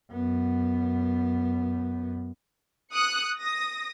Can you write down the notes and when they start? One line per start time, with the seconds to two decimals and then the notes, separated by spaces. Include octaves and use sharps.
0.12 F#2 B3
2.94 D#6 F#6 C#7
3.40 D#6 A#6